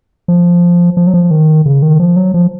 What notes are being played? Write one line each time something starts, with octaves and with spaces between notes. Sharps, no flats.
F3
F3
F#3
F3
D#3
C#3
D#3
F3
F#3
F3